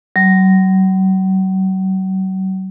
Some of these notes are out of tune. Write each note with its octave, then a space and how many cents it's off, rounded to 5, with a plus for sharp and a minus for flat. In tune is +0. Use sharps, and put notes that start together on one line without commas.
F#3 +40